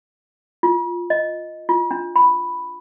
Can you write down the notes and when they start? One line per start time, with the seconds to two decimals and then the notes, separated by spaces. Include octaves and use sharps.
0.63 F4
1.10 D#5
1.69 F4
1.91 D4
2.16 B5